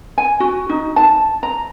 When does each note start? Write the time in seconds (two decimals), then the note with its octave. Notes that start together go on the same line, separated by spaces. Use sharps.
0.18 G#5
0.40 F#4
0.69 D#4
0.96 A5
1.43 A#5